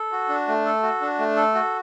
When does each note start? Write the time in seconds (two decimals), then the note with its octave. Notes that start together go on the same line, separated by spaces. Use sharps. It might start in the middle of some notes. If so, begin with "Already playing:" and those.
Already playing: A4
0.12 F#4
0.29 D4
0.48 A3
0.65 A4
0.83 F#4
1.01 D4
1.19 A3
1.36 A4
1.54 F#4